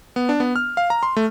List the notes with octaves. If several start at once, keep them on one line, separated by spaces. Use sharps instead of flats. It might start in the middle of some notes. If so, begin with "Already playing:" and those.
B3
D4
B3
F6
F5
A#5
C6
A3